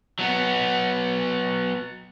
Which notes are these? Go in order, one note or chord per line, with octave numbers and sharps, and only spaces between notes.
F#3 B3